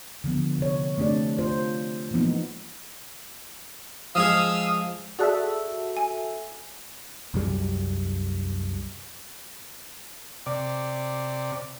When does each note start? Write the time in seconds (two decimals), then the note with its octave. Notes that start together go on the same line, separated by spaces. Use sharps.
0.24 D3 F3 B3
0.59 C3 C#5
0.98 A3 C4 D4 G4 D5
1.38 F4 C5
2.11 E3 F3 G#3 A#3 B3 D#4
4.15 F3 G#3 G#4 F5 D#6 E6
5.19 F#4 G#4 A4 D5 E5 F#6
5.97 G#5
7.34 C2 F#2 G3
10.46 C3 D5